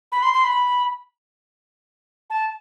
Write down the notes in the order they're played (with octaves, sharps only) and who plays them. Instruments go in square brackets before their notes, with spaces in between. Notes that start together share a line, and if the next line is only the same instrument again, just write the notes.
[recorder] B5
C6
C6
B5
A5